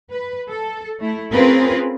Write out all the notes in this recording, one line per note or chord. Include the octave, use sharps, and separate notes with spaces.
B4
A4
A3 E4
C4 C#4 F4 G#4 A#4 B4